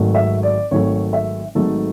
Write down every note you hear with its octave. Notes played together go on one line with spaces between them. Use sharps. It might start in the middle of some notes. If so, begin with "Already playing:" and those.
Already playing: G#1 G#2 F#3 A3
E5
D5
G#1 G#2 F#3 A3 C#5
E5
G#1 G#2 F#3 A3 A4